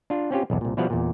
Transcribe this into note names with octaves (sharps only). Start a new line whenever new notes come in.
D4 F4
C4 C#4 F4 G4
B1 E2
C2 A#2
B2 F3 G3 E4 F5 F#5
E2 A#2